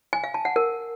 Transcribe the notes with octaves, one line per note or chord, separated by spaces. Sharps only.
G#5
F5
A5
F#5
A#4